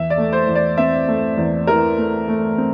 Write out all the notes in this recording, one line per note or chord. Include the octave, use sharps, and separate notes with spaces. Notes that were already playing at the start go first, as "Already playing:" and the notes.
Already playing: E2 E5
D5
A3
C5
E2
D5
C4 E5
A3
E2
E3 A#4
A3
A3
C4